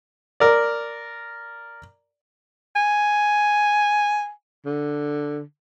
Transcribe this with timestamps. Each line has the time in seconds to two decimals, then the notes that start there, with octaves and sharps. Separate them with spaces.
0.40 A#4 D5
2.76 G#5
4.65 D3